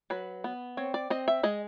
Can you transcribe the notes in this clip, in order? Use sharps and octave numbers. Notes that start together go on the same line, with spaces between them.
F#3 B4
B3
C4 C#5
D5
C4 D#5
E5
G#3 D#5